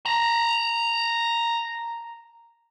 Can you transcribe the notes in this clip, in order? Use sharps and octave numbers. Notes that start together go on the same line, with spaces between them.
A5 A#5